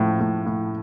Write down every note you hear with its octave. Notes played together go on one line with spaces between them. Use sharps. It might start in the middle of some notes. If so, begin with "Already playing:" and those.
Already playing: A2 F3
A2
A2